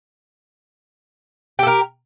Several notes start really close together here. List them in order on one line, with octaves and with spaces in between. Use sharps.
G4 A4 A#4